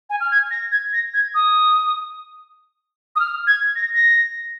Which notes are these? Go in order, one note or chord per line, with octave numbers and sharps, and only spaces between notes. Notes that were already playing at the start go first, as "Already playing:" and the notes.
G#5
F6
G#6
A#6
G#6
A#6
G#6
D#6
D#6
F6
G#6
A#6
A#6